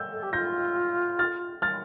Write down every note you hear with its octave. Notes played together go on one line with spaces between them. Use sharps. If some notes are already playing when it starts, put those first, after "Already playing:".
Already playing: E6 G6
A4
G4
F4 G6 A#6
F6 A6
F6 A6